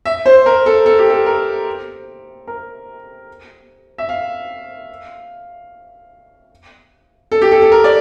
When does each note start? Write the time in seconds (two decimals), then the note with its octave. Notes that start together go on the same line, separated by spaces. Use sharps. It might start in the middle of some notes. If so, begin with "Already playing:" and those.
0.05 E5
0.26 C5
0.46 A#4
0.66 A4
0.86 A4
0.99 G4
1.10 A4
1.26 A#4
2.47 A#4
3.98 E5
4.09 F5
7.32 A4
7.42 G4
7.52 A4
7.62 A4
7.72 A#4
7.84 D5